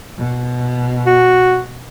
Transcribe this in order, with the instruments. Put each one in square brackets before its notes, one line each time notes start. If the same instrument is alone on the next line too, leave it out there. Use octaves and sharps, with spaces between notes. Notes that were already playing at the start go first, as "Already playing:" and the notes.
[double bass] B2
[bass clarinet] F#4